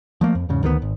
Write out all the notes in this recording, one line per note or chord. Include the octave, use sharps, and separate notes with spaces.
F3 A3 A#3
F2
E2 G#2 C#3
D2 D#3 E3 B3
G#1